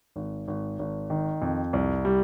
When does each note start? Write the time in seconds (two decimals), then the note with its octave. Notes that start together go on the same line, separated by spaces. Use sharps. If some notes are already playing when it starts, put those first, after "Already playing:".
0.16 G#1
0.48 G#1
0.79 G#1
1.10 D#3
1.42 F2
1.73 C2
2.05 G3